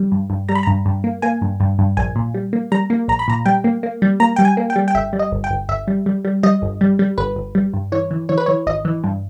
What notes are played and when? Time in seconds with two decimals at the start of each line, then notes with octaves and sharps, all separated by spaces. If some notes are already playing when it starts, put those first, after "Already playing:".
Already playing: G3
0.12 G2
0.30 G2
0.49 G3 A#5
0.55 B5
0.63 G2 A#5
0.86 G2
1.04 A#3
1.22 A#3 G#5
1.42 G2
1.60 G2
1.79 G2
1.97 A#1 G#5
2.16 A#2
2.34 G3
2.53 A#3
2.72 G3 A#5
2.90 A#3
3.08 A#1 A#5
3.19 B5
3.28 A#2 A#5
3.46 G3 G5
3.64 A#3
3.83 A#3
4.02 G3
4.20 A#3 A#5
4.36 G3 G5
4.45 G#5
4.57 A#3
4.70 G5
4.76 G3
4.88 G5
4.94 G1 E5
5.13 G3
5.19 D#5
5.32 G1
5.44 G5
5.51 G1
5.69 G1 E5
5.88 G3
6.06 G3
6.25 G3
6.43 G3 D#5
6.62 G1
6.81 G3
6.99 G3
7.18 G1 B4
7.36 G1
7.55 G3
7.74 G2
7.92 E3 C#5
8.11 E3
8.29 E3 C#5
8.38 B4
8.46 E3 C#5
8.67 G#1 D#5
8.85 E3
9.04 G2